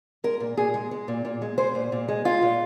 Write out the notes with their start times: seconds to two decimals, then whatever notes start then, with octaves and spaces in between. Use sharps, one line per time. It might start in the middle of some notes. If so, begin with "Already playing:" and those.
0.24 G#3 A#4
0.40 A#2
0.57 A#2 G#4
0.74 G#3
0.91 G#3
1.08 A#2
1.25 A#2
1.42 G#3
1.58 G#3 C5
1.75 A#2
1.92 A#2
2.08 G#3
2.25 G#3 F4
2.42 A#2